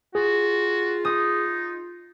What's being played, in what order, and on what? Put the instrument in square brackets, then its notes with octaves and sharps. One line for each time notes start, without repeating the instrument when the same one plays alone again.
[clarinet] F4 [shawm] F#4 [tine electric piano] G#4
[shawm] D#4 [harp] D#6